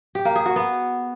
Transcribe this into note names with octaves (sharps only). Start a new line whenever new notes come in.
G4
A#3
G#4
F#4
B3